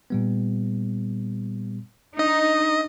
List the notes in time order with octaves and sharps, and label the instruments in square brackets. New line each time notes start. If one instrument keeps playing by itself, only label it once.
[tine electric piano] A#2 G3 B3
[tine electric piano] D4 [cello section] D#4 [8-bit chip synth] D#5